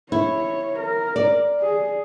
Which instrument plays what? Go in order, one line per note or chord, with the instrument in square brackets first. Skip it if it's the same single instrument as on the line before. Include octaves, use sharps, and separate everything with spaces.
[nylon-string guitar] E4 [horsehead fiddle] C#5
[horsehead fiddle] A#4
[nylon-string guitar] D5
[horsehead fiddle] G#4